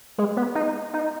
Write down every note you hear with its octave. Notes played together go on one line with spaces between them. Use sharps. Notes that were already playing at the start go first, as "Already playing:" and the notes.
G#3
B3
D#4
D#4